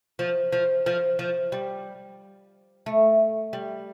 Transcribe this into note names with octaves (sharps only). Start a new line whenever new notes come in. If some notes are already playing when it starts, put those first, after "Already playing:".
F3
F3
F3
F3
G3
A3
G3